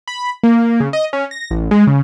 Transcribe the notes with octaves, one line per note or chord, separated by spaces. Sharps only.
B5
A#3
C#3
D#5
C#4
A#6
A1
G#3
C#3